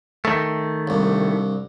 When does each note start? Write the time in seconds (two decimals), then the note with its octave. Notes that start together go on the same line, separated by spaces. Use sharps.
0.25 D#3 A3
0.87 C2 G2